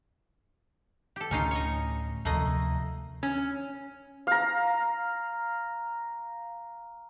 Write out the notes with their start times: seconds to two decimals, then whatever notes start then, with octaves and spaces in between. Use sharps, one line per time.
1.16 G4 A4
1.31 D2 A2 D3 C#4 D#4 F4
1.51 C#5 D#5
2.25 D2 C3 F3 A3 A#3 D#5
3.23 C#4
4.27 F5 A#5